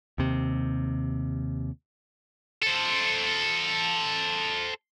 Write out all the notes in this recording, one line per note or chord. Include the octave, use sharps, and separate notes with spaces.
D#2 C3
A4 C5